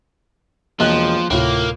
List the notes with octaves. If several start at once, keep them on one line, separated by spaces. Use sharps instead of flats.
E1 F3 A#3 D#5 F#6
D2 A2 C3 A#3 F4